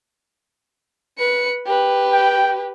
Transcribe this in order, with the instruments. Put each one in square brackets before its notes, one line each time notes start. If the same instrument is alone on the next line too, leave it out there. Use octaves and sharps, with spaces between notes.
[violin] B4 C#7
G4 B4
[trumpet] G5